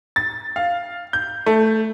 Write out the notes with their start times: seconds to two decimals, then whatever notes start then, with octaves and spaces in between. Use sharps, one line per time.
0.16 A6
0.56 F5
1.13 G6
1.46 A3